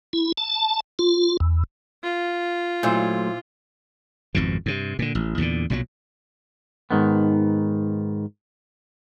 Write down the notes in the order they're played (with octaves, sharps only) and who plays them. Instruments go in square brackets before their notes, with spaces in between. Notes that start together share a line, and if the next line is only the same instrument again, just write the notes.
[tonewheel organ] E4
A5
F4
E2
[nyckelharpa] F4
[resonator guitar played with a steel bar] A#2 E4 C5 [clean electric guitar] F#3 A3
[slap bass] G#1 F2 G#2 B2
G2 C3
A#2 D3
A1
E2 G2 A#2 D3
B1 A#2 E3 F#3
[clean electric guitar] G#2 D#3 B3